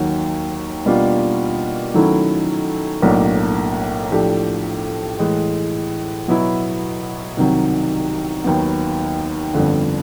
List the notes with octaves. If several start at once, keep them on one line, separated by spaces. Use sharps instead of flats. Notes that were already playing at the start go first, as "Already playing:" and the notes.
Already playing: D#2 D#3 F#3
B2 G3 A#3 D4 F4
D#3 F#3 A3 C#4 E4
B1 A2 F#3 A#3 D4
A2 F3 A3 D4 G4
A2 E3 G#3
B2 F#3 B3 E4
C2 C3 D#3 F#3
D#2 D#3 F#3 B3
G1 F2 D3 F3